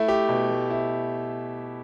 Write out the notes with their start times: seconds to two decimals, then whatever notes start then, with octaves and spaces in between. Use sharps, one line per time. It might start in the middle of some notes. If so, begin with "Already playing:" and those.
Already playing: A3 E4
0.08 G4
0.29 B2
0.50 A3
0.70 E4